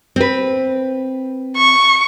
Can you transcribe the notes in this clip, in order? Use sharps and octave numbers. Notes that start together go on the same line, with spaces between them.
C4 B4
C#6